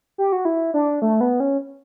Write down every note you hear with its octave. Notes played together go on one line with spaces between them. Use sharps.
G4
F#4
E4
D4
A3
B3
C#4